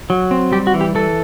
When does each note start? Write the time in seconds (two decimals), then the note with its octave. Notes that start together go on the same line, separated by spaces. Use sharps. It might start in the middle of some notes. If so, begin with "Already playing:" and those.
0.10 F#3
0.31 C4
0.52 G3 G4
0.67 F#4
0.74 E3
0.81 G4
0.95 E3 A4